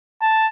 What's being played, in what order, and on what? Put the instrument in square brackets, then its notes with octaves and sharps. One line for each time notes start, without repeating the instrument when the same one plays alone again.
[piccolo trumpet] A5